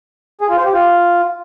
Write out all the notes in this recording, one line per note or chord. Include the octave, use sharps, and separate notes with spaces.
G#4
F4
C5
G4
F4